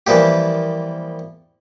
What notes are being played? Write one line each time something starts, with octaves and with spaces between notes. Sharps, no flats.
E3 F3 G3 A#3 G4